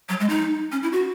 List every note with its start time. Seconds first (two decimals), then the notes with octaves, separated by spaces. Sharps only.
0.09 F#3
0.20 G#3
0.29 D#4
0.72 C#4
0.83 E4
0.92 F#4